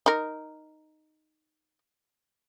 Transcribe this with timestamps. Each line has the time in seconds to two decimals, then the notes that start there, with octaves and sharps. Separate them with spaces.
0.06 D#4 A#4